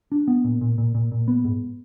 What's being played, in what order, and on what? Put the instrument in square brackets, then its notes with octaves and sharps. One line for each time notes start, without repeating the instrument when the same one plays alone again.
[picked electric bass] D4
B3
A#2
A#2
A#2
A#2
A#2
B3
G#2